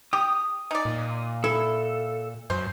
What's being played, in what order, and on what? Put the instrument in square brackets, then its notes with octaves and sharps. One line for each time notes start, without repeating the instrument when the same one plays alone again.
[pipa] G4 [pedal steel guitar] D#6
[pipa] D#4 D5
[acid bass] A#2
[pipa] E4 [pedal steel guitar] A4
[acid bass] F#2 [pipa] C5